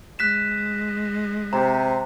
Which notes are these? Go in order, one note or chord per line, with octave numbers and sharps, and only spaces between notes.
G#3 F#6 B6 E7
C3 A#5